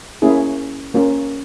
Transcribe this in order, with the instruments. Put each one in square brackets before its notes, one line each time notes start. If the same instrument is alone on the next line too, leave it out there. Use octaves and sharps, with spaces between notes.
[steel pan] A#3 C#4 E4 G#4
A#3 C#4 F4